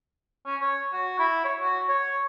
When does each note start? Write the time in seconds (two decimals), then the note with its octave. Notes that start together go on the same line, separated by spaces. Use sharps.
0.46 C#4
0.61 C#5
0.93 F#4
1.19 E4
1.44 C#5
1.61 F#4
1.89 C#5